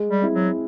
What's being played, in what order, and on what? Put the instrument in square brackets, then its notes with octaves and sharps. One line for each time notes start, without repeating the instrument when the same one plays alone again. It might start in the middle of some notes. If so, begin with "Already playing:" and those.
Already playing: [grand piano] G#3
[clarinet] G3
[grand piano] C4 E4
[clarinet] F#3